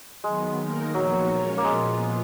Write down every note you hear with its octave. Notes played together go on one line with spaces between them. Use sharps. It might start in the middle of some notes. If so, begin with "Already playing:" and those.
D#3 F#3 G#3 B3
D#3 A#3 D#4 A#4
A#2 F3 F#3 B3 D#4 F#4
G#3 C#4 F4 A#4 C#5
A#3
A#2 F3 G#3 B3 F4